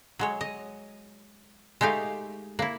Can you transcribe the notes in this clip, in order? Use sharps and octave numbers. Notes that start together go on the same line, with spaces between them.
F#3 G#3 C#5
D#5
G#3 A3 D#4 G4 F5
A#3 E4